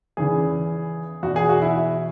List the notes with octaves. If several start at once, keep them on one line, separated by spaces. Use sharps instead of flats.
E2 C#3 E3 G#4
E2 B2 F#4
G#4
F#4
E4